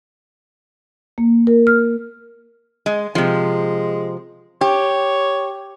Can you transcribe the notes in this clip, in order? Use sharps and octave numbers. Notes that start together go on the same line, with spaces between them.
A#3
A#4
F6
G#3
C3 F3 G#3
G4 C#5